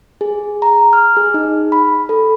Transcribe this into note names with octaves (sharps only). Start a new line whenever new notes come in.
G#4
A#5
F6
G#4
D#4
B5
A4